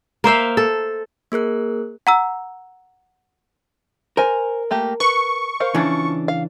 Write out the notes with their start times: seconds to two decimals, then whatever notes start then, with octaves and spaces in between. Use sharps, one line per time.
0.24 A#3 C5 E5 F5
0.57 A4
1.32 A#3 G#4 A#4 F#6
2.07 F#5 A#5 E6
4.17 A#4 C5 G#5
4.71 A3 A#3 G4
5.00 B4 C#6
5.60 A#4 C5 F5
5.75 C#3 E3 F3 D4
6.28 F5